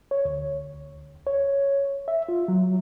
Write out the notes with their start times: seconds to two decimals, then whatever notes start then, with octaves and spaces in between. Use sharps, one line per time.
0.11 C#5
0.25 D2
1.27 C#5
2.08 E5
2.29 F4
2.48 F#3